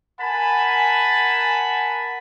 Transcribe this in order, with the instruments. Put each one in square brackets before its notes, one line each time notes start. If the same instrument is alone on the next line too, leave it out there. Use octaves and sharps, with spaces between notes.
[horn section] A#4 F#5 G#5 A5 B5